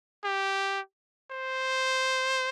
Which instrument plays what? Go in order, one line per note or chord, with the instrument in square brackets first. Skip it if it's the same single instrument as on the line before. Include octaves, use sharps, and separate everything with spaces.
[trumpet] G4
C5